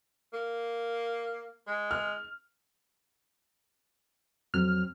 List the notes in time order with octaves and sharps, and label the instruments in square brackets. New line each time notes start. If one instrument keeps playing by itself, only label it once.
[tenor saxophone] A#3
G#3
[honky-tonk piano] F6
[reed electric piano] F2 F#3 C4 [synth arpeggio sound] F6